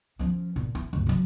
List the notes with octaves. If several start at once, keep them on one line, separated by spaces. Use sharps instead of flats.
F3 C#4
A#2
E4
G1 D2
C3 F#3